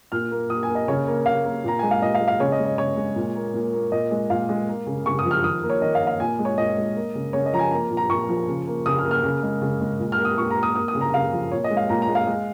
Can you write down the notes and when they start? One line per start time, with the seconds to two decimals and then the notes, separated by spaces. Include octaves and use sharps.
0.12 A#2 F6
0.31 A#3
0.50 A#2 D#6
0.63 G#5
0.69 A#3
0.75 D#5
0.88 C#3 C#5
1.07 A#3
1.26 C#3 F5
1.45 A#3
1.64 A#2 A#5
1.79 G#3 G#5
1.91 F5
2.02 A#2 D#5
2.15 F5
2.20 G#3
2.28 F5
2.40 C#3 C#5
2.52 D#5
2.59 G#3
2.65 D#5
2.78 C#3 C#5
2.97 G#3
3.16 A#2
3.35 A#3
3.54 A#2
3.73 A#3
3.92 A#2 D#5
4.11 G#3
4.30 A#2 F5
4.49 G#3
4.68 A#3
4.87 C#3
5.06 C#3 C#6
5.19 D#6
5.25 F3
5.31 F6
5.44 D#3 D#6
5.63 A#3
5.70 C#5
5.82 D#3 D#5
5.95 F5
6.01 A#3
6.07 F5
6.20 A#2 G#5
6.39 G#3
6.45 C#5
6.58 A#2 D#5
6.77 G#3
6.96 A#3
7.15 C#3
7.33 C#3 C#5
7.46 D#5
7.53 F3 A#5
7.59 G#5
7.71 A#3 A#5
7.91 A#2
7.97 A#5
8.09 A#2 C#6
8.29 F3
8.48 C#3
8.67 A#3
8.86 C#3 D#6
8.98 F6
9.05 A#3
9.11 F6
9.24 C#3
9.43 G#3
9.62 C#3
9.81 G#3
10.00 A#2
10.12 F6
10.19 A#3
10.25 D#6
10.38 A#2 C#6
10.51 A#5
10.56 A#3
10.63 D#6
10.75 A#3 D#6
10.88 D#6
10.95 C#3
11.01 A#5
11.14 C#3 F5
11.32 F3
11.52 A#2 C#5
11.64 D#5
11.70 G#3
11.77 F5
11.89 A#2 A#5
12.02 A#5
12.08 G#3
12.15 F5
12.27 G#3